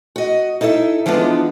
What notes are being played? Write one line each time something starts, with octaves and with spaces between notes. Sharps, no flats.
F#4 D#5
D#4 E4 A4 D5 E5
E3 F3 G#3 B3 D4